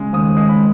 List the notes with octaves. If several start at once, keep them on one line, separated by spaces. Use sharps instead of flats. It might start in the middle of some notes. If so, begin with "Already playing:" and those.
Already playing: C#3 G#3
D#2 D#6
G#3
B5